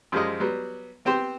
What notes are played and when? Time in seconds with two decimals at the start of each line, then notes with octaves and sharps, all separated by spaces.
0.12 F#2 F3 G3 G#3 D#5
0.40 F#3 G3 B3
1.05 B3 C4 G4 C5